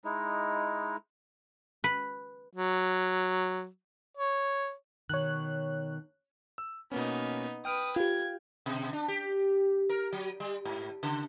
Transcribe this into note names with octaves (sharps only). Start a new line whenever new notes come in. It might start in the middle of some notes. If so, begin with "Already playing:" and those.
G#3 D#4 E4
B4
F#3
C#5
B2 D#3 C#5 F#6
E6
B2 A#3 B3 C#4 D#4
B4 G5 D#6 F6 D7
F4 G4 G#6
B2
D4
G4
A#4
F#3
G3
G#2
C#3